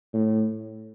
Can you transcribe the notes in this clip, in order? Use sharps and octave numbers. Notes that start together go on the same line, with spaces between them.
A2